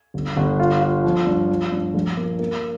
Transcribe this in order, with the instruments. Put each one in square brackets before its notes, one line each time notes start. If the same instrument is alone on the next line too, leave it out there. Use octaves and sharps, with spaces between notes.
[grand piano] G1
G1
F4
F4
F3
G2
F3
G2
A#1
A#3
A#3